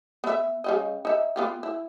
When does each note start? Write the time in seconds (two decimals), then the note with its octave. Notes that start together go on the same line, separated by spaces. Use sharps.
0.24 B3 E5
0.64 C#3 G3 D#5
1.05 D#4 E5
1.36 B3 F4 G4
1.63 E4